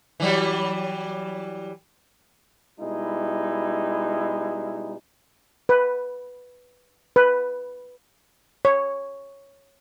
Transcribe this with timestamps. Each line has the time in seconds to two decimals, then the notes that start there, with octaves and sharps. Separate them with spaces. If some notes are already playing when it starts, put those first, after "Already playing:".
0.20 E3 F#3 G3
2.80 B2 G3 G#3 D#4 E4
5.69 B4
7.16 B4
8.65 C#5